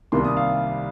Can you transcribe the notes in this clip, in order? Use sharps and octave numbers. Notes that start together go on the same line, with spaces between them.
C2 C3 D#3 G3 A#3 C6
D#6
F5